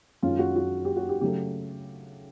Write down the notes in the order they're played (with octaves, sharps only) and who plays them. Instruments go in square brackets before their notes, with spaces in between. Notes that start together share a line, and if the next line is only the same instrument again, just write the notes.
[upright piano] F#2 D#3 G#3 C#4 F4
F#4
F#4
G4
F#4
G4
C#3 F#3 A3 G4